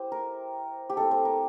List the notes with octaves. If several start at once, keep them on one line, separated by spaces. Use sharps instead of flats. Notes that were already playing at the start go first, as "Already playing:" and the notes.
Already playing: E4 G4 C5
A#4
G4
A3 C4 E4 A4
C5
A#4